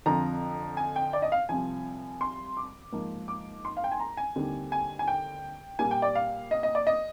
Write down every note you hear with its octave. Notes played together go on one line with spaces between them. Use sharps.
F2 D3 F3 C4 A#5
G#5
G5
D5
D#5
F5
C2 C3 F3 G#5
C6
D6
G#2 F3 A#3
D6
C6
F5
G5
G#5
A#5
G#5
D#2 D3 G3 C4
G#5
G#5
G5
A#2 G3 A#3 G#5
G5
D5
F5
D#5
D#5
D5
D#5